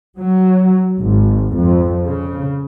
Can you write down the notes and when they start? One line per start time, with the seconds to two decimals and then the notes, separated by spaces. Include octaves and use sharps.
0.19 F#3
1.00 G#1
1.55 F2
2.07 C#3